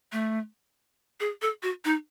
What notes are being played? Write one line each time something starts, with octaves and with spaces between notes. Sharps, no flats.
A3
G#4
A4
F#4
D#4